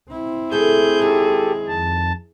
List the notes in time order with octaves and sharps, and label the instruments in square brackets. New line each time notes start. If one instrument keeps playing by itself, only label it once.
[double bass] C4 E4
[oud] D3 A3 A4 [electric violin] G#4 [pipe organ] G6
[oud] D#2 D#3 G#3 [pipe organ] G4 A4
[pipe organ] F2 A5